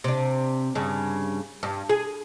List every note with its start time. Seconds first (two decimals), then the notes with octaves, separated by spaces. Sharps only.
0.04 C3 D4
0.75 G2 C#3
1.63 G2
1.89 G#4